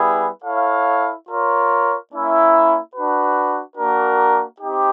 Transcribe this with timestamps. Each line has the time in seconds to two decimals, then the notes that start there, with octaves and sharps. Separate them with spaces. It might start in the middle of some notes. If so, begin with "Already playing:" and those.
Already playing: G3 B3 E4 G#4 B4
0.44 E4 A4 C#5 F5
1.28 F4 A#4 C#5
2.11 A#3 C#4 E4
2.94 D4 F#4 B4
3.77 A#3 D4 F#4 A#4
4.60 C4 D#4 G4